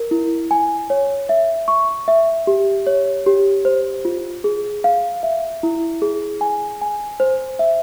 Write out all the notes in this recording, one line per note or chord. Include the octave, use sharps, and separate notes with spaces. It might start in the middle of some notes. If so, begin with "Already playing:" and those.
Already playing: A#4
E4
G#5
C#5
E5
C#6
E5
G4
C#5
G4
C5
F4
G#4
F5
E5
E4
G#4
G#5
G#5
C5
E5